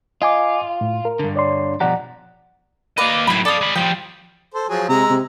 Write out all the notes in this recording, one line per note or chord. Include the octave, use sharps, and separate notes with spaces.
F4 D#5 G#5 D6
A2
A#4
G2 D3
C#5 D5 C6
B2 F3 G4 D5 F#5 A#5
A#3 B4 D5 D#5 F5
F#2 A2 E4 B5
A4 D5 F5 D#6
G#3 B5
F3 G3 G5
A4 C5
F3 F#3 G#4
C3 G#3 A#5 E6
C3